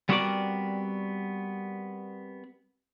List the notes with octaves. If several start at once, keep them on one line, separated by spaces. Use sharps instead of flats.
G3 B3 C4 F#4 A#4 D5